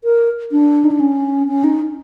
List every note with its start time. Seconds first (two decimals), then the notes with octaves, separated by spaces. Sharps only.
0.04 A#4
0.52 D4
0.84 D#4
0.91 D4
1.00 C#4
1.48 C#4
1.64 D#4